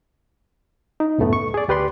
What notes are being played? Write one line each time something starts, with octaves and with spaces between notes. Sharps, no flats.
D#4
C#2 F#2 A2 A3 B3
C#6
G#4 D5
D2 G4 B4 D5 C6